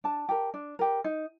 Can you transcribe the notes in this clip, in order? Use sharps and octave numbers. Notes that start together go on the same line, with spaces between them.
D4 A5
G4 A#4
D4
G4 A#4
D#4